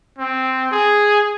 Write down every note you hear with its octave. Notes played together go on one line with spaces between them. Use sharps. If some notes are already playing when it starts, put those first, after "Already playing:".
C4
G#4